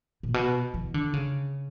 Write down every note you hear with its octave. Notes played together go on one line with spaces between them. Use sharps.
A#2
B2
E3
D3
C#3